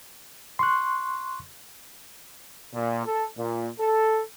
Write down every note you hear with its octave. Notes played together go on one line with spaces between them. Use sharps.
C6 C#6 F#6
A#2
A4
A#2
A4